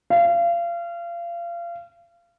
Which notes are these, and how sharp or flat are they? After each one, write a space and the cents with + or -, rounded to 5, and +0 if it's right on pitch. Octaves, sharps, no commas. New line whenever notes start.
F5 -30